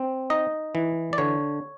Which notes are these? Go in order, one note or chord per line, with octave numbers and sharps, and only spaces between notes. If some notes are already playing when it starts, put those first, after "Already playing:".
Already playing: C4
D#4 D#5
E3
D5
D3 C#5